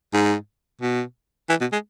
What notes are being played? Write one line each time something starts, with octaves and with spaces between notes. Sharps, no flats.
G#2
B2
E3
B2
G#3